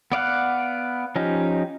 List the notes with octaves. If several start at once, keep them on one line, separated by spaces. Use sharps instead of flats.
B3 D5 F5 F#5
F3 C#4 D#4 G4